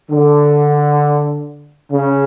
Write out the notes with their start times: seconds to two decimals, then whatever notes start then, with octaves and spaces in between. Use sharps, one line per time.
0.11 D3
1.92 C#3